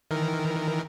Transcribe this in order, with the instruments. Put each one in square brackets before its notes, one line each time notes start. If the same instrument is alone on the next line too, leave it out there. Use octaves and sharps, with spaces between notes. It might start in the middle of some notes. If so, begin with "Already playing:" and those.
[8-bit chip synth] D#3 E3 A#4